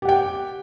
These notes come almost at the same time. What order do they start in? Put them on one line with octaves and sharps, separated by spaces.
G4 F#5 G5